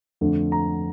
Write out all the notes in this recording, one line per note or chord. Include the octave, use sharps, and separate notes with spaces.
F2 D3 A3
A#5